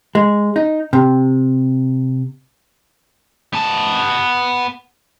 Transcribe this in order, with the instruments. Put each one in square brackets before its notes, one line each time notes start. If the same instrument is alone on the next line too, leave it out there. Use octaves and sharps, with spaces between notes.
[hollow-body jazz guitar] G#3
D#4
C3
[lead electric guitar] B3 A5